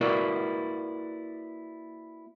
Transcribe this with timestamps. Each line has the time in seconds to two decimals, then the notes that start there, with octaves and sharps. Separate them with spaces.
0.01 A#3 E4 F#4 A#4 B4 D5